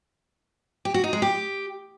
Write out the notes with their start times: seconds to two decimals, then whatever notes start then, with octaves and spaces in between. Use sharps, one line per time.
0.85 G4
0.94 F#4
1.04 D#4
1.13 G#3
1.22 G4